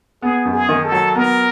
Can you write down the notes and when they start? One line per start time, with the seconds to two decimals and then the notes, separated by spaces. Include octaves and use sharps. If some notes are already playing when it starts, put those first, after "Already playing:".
0.22 B3 G#4
0.45 F#2
0.53 G#4
0.69 D#3
0.84 A4
0.92 F#3
1.15 B3 A#4